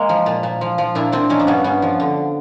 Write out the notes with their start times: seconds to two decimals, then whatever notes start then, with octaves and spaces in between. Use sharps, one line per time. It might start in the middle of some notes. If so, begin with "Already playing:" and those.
Already playing: G#3 A#3
0.09 F3
0.26 A#2
0.43 A#2
0.61 F3
0.78 F3
0.95 A#2 D4 E4
1.12 A#2 C4 D4
1.29 F3 C#4 D#4
1.40 D4
1.47 G2 B3 C#4
1.64 G2 B3 C#4
1.82 F3
2.00 D3